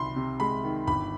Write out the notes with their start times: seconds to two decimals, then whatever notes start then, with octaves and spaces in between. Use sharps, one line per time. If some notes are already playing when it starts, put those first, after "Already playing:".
Already playing: C2 C3 D#3 B5 C6
0.16 C3
0.40 G#3 B5
0.64 D#3
0.87 G1 B5